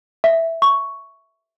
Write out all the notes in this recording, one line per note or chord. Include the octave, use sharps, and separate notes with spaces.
E5
C#6